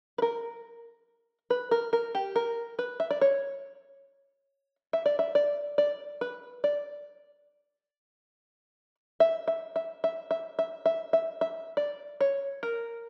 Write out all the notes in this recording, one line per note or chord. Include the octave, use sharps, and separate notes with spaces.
B4
A#4
B4
A#4
A#4
G4
A#4
B4
E5
D5
C#5
E5
D5
E5
D5
D5
B4
D5
E5
E5
E5
E5
E5
E5
E5
E5
E5
D5
C#5
A#4